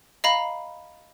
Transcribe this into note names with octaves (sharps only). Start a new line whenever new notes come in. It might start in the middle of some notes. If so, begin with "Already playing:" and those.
D#5 F5 A#5 B5